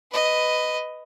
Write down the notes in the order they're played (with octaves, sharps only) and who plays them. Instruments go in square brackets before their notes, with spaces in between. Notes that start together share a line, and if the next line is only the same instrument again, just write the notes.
[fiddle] B4 D#5